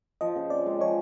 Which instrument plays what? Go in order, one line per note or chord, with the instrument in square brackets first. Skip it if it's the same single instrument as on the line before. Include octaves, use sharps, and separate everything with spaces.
[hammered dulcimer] F3 [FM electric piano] D#5
[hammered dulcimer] C#3
[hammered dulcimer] C4 [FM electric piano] D5
[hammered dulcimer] G#3
[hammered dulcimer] F3 [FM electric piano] C#5